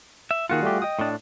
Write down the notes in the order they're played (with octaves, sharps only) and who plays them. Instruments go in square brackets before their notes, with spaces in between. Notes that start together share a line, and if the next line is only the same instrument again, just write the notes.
[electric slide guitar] E5
[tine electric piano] D#3 A#3 C#7 [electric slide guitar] F4 F#4 G#4
[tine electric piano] G3 A3 G4
D#5 G5 D#6
[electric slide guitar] A2 D4